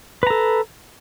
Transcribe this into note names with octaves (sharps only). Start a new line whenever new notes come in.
A4 B4 A#5